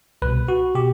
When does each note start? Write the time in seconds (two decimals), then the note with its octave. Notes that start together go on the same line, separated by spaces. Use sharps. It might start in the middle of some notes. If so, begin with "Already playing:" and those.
0.22 C2 B2 B4
0.48 F#4
0.75 B2 G4